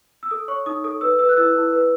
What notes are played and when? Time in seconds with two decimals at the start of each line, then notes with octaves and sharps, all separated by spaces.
0.23 E6
0.31 A4 D#6
0.48 C#5 C#6
0.66 D#4 D#6
0.84 A4 D#6
1.01 B4 E6
1.19 B4 E6
1.29 F#6
1.37 E4 E6
1.55 E4
1.73 B4